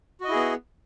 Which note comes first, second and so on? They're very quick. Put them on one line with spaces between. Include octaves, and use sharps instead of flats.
F#4 D#5 E4 G#4 B3